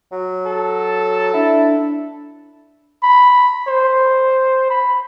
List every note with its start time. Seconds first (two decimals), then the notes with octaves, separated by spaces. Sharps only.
0.12 F#3
0.46 A4
1.34 D4 E4
3.03 B5
3.67 C5
4.70 B5